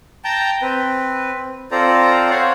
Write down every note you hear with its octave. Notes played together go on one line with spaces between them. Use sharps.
G5 A5 A#5 G6
C4 B4
C4 F4 A4 C5 D5 A#5
C5 C#5 F5 F#5